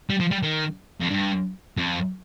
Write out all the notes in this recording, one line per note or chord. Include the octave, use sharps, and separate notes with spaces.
G3
F3
G3
D#3
F2
G2
F2